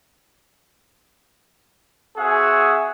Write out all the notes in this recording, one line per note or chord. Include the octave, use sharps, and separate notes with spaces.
C4 F#4 G#4 E5 F#5 G#5